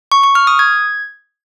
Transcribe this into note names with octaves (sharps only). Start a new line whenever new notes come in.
C#6
C#6
F6
D#6
G#6